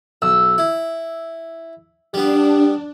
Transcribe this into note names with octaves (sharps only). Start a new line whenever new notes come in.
B1 E6
E4
G3 B3 D4 G4